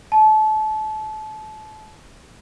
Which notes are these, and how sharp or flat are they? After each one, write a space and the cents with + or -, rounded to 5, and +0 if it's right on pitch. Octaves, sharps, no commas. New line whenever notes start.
A5 -30